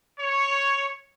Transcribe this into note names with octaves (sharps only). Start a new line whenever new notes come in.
C#5